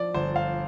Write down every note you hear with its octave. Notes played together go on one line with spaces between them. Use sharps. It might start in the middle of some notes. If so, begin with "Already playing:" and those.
Already playing: F3 D5
G1 C5
F5